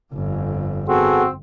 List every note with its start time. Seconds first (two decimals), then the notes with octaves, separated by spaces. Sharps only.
0.14 G1 F2
0.88 B3 C4 F#4 G#4 A4